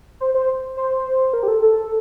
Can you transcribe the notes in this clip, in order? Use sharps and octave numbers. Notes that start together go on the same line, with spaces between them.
C5
C5
C5
A#4
G4
A4
A4